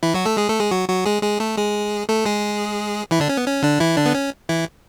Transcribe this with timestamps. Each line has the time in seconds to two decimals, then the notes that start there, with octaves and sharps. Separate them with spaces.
0.03 E3 E4
0.14 F#3 F#4
0.25 A3 A4
0.37 G#3 G#4
0.49 A3 A4
0.60 G#3 G#4
0.71 F#3 F#4
0.89 F#3 F#4
1.05 G#3 G#4
1.23 G#3 G#4
1.40 A3 A4
1.57 G#3 G#4
2.09 A3 A4
2.25 G#3 G#4
3.11 E3 E4
3.20 D3 D4
3.29 C#4
3.37 B3
3.47 C#4
3.63 D3 D4
3.80 E3 E4
3.97 D3 D4
4.06 B3
4.15 C#4
4.49 E3 E4